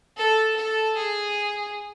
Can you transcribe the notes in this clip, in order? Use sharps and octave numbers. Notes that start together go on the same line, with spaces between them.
A4
A4
G#4